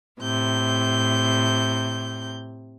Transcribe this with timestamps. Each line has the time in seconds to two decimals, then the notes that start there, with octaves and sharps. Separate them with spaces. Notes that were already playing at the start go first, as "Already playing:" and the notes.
0.20 A2 C3 G6